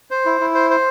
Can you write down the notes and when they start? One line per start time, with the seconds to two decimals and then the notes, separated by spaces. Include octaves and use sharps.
0.11 C5
0.25 E4
0.41 E4
0.55 C5
0.70 C5